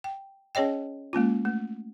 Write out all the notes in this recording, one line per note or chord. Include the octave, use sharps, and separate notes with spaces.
G5
C#4 G#4 C#5 D#5 G5
G#3 A#3 C#4 F4
A3